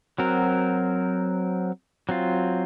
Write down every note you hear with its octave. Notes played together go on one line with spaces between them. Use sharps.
F#3 C4 F#4 A#4
F#3 C4 F4